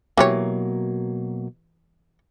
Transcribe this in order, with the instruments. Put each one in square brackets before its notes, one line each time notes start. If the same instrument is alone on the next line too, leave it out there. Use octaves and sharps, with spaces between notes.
[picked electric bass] B2 F#3 A#3 [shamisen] E3 G4 C#5